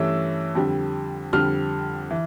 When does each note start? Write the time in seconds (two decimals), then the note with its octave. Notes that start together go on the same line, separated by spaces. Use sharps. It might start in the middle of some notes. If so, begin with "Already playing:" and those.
Already playing: G2 E3 A3 C#4 E6
0.55 F2 D3 G3
1.33 F2 D3 G3 F6
2.11 E3